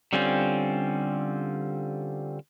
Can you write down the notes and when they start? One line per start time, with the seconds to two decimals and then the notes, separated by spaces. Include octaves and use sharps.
0.13 D3 G3 C4 C#4 F4